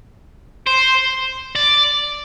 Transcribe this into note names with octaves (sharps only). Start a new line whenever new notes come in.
C5
D5